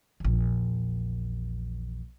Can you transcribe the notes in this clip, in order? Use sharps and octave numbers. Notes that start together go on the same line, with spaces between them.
A#1 E2